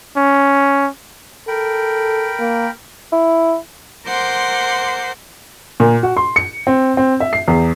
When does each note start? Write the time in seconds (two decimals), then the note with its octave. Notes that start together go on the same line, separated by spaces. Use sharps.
0.17 C#4
1.48 A4 A#4 G5 B5
2.40 A#3
3.12 E4
4.07 A#4 C5 F#5 C6 D6 G6
5.80 A#2
6.03 F#4
6.17 C6
6.36 C#7
6.67 C4
6.97 C4
7.20 E5
7.33 C7
7.48 E2